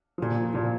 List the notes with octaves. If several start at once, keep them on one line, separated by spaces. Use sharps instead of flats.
A#2 F3
A#2 F3